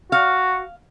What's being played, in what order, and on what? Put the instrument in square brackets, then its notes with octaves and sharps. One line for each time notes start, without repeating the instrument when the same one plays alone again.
[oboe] F#4 [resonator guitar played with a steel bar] F5